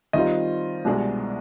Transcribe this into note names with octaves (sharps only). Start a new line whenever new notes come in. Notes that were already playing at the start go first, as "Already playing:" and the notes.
D#3 G3 C4 F4 D#5
C2 B2 G#3 D4 G#4